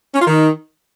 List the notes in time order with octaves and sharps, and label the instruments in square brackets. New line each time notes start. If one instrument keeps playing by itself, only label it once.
[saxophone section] C#4
F4
D#3